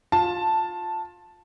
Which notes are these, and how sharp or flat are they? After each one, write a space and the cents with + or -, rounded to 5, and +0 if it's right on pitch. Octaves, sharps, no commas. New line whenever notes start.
F4 +20 A5 +0